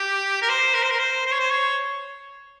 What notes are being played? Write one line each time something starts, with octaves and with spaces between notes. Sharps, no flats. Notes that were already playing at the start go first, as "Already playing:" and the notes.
Already playing: G4
A#4
C5
A#4
C5
A#4
C5
C5
C#5
C5
C#5